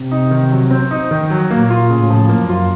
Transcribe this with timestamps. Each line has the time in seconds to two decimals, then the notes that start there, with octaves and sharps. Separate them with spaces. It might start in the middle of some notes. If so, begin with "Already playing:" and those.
Already playing: C3
0.11 D#4
0.31 D#3
0.51 F#3
0.71 C4
0.91 D#4
1.11 D#3
1.30 F#3
1.50 A#2 A#3
1.70 F4
1.90 A2 C#3
2.10 F3
2.29 F#2 A#3
2.50 F4